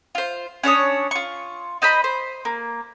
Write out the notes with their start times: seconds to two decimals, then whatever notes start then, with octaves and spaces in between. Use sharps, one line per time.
0.15 F4 C5
0.63 C#4 D4 C#5 D#6
1.11 F4 C#6
1.82 D#4 C5 D#5 B5
2.04 C5
2.45 A#3